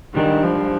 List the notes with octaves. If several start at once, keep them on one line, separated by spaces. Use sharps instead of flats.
G#2 D#3 G3 D4 G#4
F3